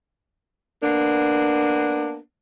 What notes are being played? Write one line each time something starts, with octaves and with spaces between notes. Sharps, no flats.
A#3 B3 D4